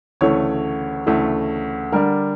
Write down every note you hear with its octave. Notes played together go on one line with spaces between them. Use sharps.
D2 C#3 E3 A3 C#5
D2 C#3 E3 A3
D3 G3 D4 A#4